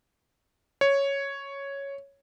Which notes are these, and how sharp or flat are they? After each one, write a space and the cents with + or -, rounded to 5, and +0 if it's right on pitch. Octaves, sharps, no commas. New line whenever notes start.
C#5 +0